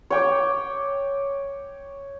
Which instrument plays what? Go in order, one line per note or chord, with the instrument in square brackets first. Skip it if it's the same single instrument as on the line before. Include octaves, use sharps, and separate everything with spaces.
[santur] C#5 G5 D6